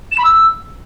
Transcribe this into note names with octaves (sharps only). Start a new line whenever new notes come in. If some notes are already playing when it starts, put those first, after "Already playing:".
E7
B5
E6